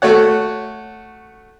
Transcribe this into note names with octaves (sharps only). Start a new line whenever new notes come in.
A3 F#4 C#5 F#5